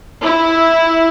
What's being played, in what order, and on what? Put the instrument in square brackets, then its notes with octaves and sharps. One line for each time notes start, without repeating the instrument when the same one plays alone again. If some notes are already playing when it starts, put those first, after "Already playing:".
[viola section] E4